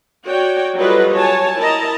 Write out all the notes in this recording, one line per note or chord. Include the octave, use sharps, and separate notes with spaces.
F#4 C#5 D5 G5
F#3 G3 F4 A4 B4 D#5
F#3 C#5 G#5 A5
E4 A#4 D#5 A5 A#5